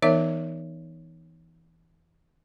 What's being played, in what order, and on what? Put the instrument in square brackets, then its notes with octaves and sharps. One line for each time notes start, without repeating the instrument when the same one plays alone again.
[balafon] E3 B3 D#4 A#4 C#5 E5